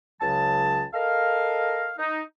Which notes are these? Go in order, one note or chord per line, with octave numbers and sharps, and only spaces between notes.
C#2 C#3 F#3 A5
A4 A#4 D#5 F5
D#4